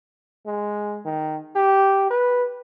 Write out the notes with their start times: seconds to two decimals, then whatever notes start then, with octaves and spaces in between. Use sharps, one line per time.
0.47 G#3
1.06 D#3
1.56 G4
2.11 B4